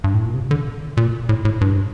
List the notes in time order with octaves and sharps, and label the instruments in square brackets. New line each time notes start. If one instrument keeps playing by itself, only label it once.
[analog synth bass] G2
A2
A#2
C3
D3
A#2
A2
A2
G2